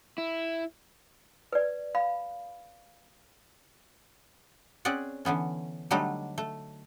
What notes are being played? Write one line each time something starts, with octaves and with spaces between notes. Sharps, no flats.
E4
B4 D5
F5 B5
C4 C#4 G#4 D5 F#5
D3 E3 B3 C#4
D3 F#3 G3 A3 D4 D#4
A3